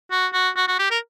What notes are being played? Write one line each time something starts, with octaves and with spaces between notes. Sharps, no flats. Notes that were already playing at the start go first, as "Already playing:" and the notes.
F#4
F#4
F#4
F#4
G4
A#4